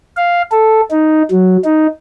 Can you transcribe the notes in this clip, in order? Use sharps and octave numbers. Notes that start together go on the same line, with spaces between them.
F5
A4
D#4
F#3
D#4